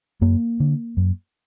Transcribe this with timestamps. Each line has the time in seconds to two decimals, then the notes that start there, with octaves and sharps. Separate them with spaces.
0.21 F#2 A#3
0.60 D3
0.97 F#2